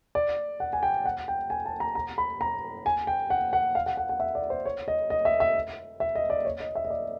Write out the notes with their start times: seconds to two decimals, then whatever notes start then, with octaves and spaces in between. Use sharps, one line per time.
0.15 D5
0.60 F#5
0.73 G#5
0.83 G5
1.05 F#5
1.28 G5
1.50 G#5
1.66 A5
1.80 A#5
1.95 A#5
2.18 B5
2.41 A#5
2.86 G#5
3.07 G5
3.30 F#5
3.53 F#5
3.75 F5
3.86 F#5
3.97 F#5
4.09 F#5
4.20 E5
4.35 D5
4.50 C5
4.65 C#5
4.88 D#5
5.10 D#5
5.25 E5
5.40 E5
6.00 E5
6.15 D#5
6.30 D5
6.45 C#5
6.60 D#5
6.75 E5
6.85 D#5
6.90 D5